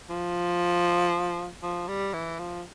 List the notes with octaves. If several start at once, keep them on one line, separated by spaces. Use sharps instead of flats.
F3
F3
G3
E3
F3